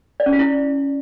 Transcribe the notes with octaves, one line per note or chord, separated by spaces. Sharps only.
D5
C#4
F4
E4